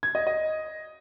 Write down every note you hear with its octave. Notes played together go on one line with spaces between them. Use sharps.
G#6
D#5
D#5